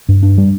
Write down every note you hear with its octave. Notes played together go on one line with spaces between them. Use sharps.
G2
D4
G3